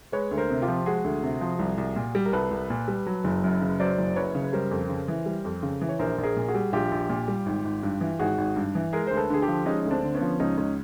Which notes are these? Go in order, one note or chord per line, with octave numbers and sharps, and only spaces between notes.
G#3 B4 C#5
D2
A#4 C5
C3
F4 G4
F3
G#3 F#4 G#4
D2
C3
F3
C2
C2
A#2
G3
A#4
C2 A4 B4
C2
A#2
G3
F#3
F#1
F#2
C#3
F#3 C5 D5
F#1
F#2 B4 C#5
C#3
B4
G3 A#4 C5
F2
C#3
E3
G3
F2
C#3
E3
C#5
A#1 A#4 C5
A#1
G#4 A#4
A#2
F#4 G#4
G3
A#1 F4 G4
A#1
A#2
G3
G#1
G#1
G2
E3
G#1 F#4 G#4
G#1
G2
E3
G#3 G#4 A#4
D2 C5
A4 B4
D3 G#4
G4 A4
F3
G#3 C#4 D#4
D2 D#4
C4 D4
D3
B3 C#4
F3
C#2 C#4 D#4
C#2 C#4 D#4